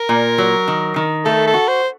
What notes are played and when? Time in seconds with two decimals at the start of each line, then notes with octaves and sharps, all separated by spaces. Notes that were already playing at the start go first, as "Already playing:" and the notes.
Already playing: A#4
0.09 A#2
0.38 F#3
0.68 D#3
0.96 D#3
1.25 A3 A4
1.47 A4
1.54 F#4
1.68 C5